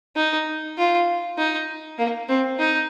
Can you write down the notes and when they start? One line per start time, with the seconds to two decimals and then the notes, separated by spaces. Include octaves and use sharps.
0.16 D#4
0.78 F4
1.38 D#4
1.98 A#3
2.29 C4
2.59 D#4